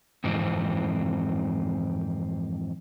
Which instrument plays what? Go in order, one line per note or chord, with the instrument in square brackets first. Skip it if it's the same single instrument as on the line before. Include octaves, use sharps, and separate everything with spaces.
[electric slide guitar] F2 G#2 E3 C4